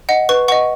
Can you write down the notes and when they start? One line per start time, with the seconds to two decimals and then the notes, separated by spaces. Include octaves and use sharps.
0.09 D#5 F#5
0.29 B4 C#6
0.48 D#5 F#5 C#6